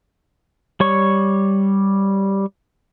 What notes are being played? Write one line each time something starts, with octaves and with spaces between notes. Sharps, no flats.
G3 C#5 C#6